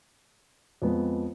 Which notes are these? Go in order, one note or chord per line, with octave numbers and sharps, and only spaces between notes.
F2 F3 G#3 B3